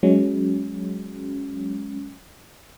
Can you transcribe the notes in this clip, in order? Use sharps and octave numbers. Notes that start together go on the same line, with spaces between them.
F#3 G#3 C#4